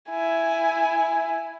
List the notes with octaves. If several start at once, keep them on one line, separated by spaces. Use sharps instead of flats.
E4 G#5